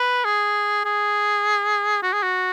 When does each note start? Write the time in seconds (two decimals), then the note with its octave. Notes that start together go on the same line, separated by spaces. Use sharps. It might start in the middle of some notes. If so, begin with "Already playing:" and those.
Already playing: B4
0.25 G#4
0.85 G#4
2.03 F#4
2.13 G#4
2.23 F#4